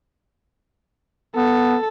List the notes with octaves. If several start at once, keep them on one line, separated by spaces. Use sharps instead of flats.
B3 A4